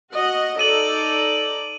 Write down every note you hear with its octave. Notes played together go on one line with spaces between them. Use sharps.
F#4 D#5 F#5
D#4 A4 D5 D#7 F#7